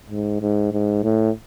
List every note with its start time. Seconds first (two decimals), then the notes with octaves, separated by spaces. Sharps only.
0.10 G#2
0.42 G#2
0.72 G#2
1.04 A2